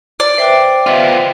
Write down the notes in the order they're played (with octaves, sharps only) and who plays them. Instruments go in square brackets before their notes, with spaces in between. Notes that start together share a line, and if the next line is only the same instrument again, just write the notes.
[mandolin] D5
[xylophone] B4 E5 [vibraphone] C5 G5
[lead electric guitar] B3 F4 [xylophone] D#5 E5